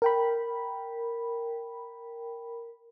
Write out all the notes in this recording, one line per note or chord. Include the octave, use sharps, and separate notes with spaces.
A#4 G5 B5